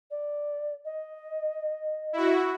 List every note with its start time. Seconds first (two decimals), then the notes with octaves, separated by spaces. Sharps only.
0.11 D5
0.85 D#5
2.13 E4 F#4